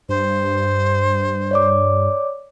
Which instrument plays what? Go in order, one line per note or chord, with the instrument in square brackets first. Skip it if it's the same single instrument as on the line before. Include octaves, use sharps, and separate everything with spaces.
[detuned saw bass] G2 [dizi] C5
[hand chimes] C#5 D5 D6